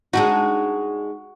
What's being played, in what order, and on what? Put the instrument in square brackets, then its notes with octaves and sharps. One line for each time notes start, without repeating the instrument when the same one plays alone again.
[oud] G#3 D4 D#4 [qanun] F#4